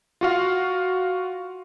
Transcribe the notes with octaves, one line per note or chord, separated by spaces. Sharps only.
F4 F#4 F5